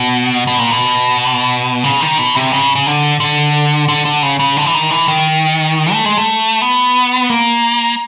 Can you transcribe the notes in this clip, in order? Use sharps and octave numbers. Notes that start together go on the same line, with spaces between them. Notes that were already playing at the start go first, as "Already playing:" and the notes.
Already playing: B2
B2
A#2
B2
C#3
D#3
B2
C3
C#3
C#3
D3
D3
D3
D3
C#3
C#3
D3
E3
D#3
E3
D#3
A3
G#3
A3
B3
A#3